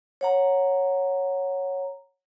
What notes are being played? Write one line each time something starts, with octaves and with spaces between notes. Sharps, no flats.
C#5 F#5 A#5